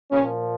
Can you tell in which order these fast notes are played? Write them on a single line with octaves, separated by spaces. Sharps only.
A#2 C#3 C#4 F3